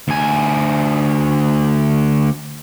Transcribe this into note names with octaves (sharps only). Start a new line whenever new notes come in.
D2 G#5